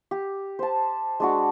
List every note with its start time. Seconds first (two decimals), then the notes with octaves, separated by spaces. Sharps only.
0.11 G4
0.59 C5 A5
1.20 G#3 D4 F#4